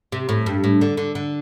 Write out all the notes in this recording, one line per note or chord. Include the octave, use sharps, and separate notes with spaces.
C3
A2
G2
A2
D3
D3
D3